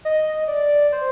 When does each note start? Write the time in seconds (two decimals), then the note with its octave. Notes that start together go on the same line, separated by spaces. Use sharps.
0.05 D#5
0.48 D5
0.92 C5